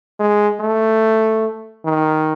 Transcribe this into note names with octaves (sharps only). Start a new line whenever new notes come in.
G#3
A3
D#3